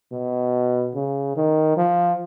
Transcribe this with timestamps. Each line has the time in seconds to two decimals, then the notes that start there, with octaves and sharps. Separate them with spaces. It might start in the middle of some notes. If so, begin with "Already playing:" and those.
0.12 B2
0.95 C#3
1.36 D#3
1.77 F3